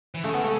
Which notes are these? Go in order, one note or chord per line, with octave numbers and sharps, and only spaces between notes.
E3
C#3 A3
B3
A3